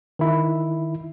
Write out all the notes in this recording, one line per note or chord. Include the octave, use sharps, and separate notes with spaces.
D#3 E4